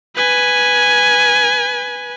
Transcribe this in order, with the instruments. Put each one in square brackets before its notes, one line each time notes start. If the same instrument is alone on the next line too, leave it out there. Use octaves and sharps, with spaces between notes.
[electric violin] B4 G#5